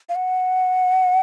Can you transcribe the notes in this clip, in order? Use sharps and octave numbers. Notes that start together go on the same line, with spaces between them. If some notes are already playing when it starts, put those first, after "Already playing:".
F5
F#5